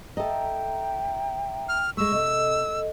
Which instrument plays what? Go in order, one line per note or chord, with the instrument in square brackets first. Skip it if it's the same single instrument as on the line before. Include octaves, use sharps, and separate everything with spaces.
[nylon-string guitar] A4 D#5 [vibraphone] E5 A#5 [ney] G5
[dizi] F6
[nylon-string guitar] G#3 A3 [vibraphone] C#6 [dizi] E6
[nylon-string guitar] C3 [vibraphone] A4 D#5